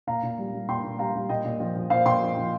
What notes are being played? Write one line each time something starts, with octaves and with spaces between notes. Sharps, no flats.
A#2 F5 A#5
A#2
G3
G3
A#2 G5 C6
A#2
G3 F5 A#5
G3
A#2 D#5 G5
A#2
F3
F3
A#2 C5 F5
A#2 G5 C6
F3
F3